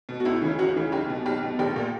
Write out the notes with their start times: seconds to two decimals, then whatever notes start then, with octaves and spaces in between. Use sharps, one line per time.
0.09 B2
0.20 F#4
0.25 C#2 E4
0.42 C#3 E3
0.59 C#2 F#4
0.76 C#3 E3
0.92 B1 G4
1.09 B2
1.26 B1 G4
1.43 B2
1.59 A#1 G4
1.76 A#2